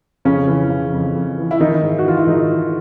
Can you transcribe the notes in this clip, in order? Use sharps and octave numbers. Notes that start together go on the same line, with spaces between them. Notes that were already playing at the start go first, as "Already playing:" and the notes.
F2 C#3 C#4
E3
C#3
F2
F2
E3
E4
D#3 E3 D#4
G#2
F#4
E3 F4
E4
G#2 D#3 D#4
E3